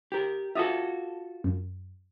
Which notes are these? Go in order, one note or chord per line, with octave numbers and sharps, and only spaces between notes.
G4 A#4
F4 F#4 A4 E5 D#6
F#2